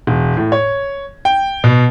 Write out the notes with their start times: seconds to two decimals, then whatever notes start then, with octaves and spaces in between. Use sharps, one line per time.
0.07 E1
0.37 A2
0.52 C#5
1.25 G5
1.64 B2